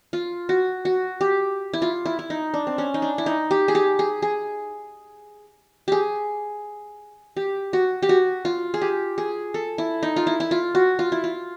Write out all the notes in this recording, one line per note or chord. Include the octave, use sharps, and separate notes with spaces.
F4
F#4
F#4
G4
E4
F4
E4
E4
D#4
D4
C4
C#4
D#4
D4
E4
D#4
G4
G#4
G4
G#4
G#4
G4 G#4
G4
F#4
G4
F#4
F4
G#4
G4
G#4
A4
E4
D#4
F4
E4
E4
F4
F#4
F4
E4
F4